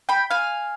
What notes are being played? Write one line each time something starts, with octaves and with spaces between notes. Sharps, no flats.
G5 B5
F5 G#5